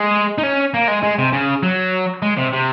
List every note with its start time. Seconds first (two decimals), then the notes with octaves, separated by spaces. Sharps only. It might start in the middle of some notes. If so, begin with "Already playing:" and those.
Already playing: G#3
0.38 D#4
0.43 C#4
0.74 A#3
0.88 G#3
1.03 G#3
1.19 C3
1.33 C#3
1.63 F#3
2.22 G#3
2.37 C3
2.53 C3